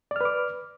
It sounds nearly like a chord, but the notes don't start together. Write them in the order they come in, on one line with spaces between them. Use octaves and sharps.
D5 F6 B4 D6